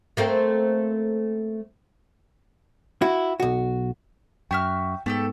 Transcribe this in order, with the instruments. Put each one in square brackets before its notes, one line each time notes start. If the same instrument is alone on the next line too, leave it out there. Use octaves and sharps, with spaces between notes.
[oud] A3 A#3 C4
[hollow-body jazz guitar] E4 F#4
B1 F#4
[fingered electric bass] F#2 [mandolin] F#4 E5 F6 [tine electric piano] G5
[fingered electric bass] G#2 [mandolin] A3 G4 A4 [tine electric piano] B3